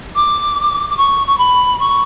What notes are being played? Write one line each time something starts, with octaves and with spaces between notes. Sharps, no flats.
D6
D6
C#6
C#6
B5
C#6